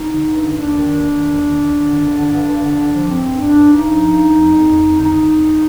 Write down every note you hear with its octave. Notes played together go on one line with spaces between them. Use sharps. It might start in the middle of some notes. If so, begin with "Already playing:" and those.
Already playing: D#4
D3
G2
D3
D#2 D4
D#3
D#2
D#3
D#2
D#3
D#3
D#3
D3
G2
D3
G2
G2
D3
D3
F3
G2 C4
G2
G2 D4
G2
G2 D#4
F3
G2
F3
F2
F2
F2
F2
D3 D#4
D3
F2